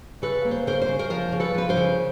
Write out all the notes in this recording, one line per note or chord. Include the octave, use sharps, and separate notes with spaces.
C#3 A4 B4
A#3
C5
C#3 A#4 C5
C5
C#3
A#4 C5
F3 A#4 C5
C#3
A4 B4
F3 B4
A#4 C5
C#3